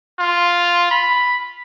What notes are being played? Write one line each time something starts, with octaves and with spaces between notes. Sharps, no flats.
F4
B5